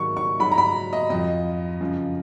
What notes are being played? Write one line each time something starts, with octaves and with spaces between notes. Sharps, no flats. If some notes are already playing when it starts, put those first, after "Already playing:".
Already playing: G#2 D#3 F#3 C#6
C#6
G#2 F#3 B5
A#5
B5
D#5
F2 F3 D#5
F#2 C#3 F3